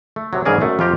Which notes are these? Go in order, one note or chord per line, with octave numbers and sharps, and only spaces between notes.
A3
C3 F#3
G#2 C#3 E3 G#4 A#4 D5
F#2 A3
F2 F4 G4 A#5